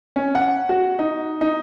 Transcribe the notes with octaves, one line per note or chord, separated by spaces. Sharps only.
C#4
F#5
F#4
D#4
D#4